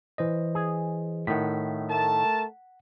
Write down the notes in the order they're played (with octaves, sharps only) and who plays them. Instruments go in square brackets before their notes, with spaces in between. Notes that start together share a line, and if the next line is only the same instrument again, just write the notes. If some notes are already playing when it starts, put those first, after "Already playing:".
[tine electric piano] E3 C5 D#5
[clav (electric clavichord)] G#4
[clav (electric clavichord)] A2 D#3 [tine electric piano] F#5 B6
[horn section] A3 A#4 A5